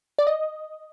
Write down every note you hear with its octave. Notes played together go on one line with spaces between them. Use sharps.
D5
D#5